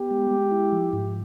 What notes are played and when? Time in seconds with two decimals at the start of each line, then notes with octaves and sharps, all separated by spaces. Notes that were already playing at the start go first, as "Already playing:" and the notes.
Already playing: B3 G4
0.11 G#3
0.31 G#3
0.51 E4
0.72 F3
0.93 G#2